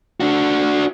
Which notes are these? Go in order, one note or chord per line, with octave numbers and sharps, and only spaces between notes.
D4 F#4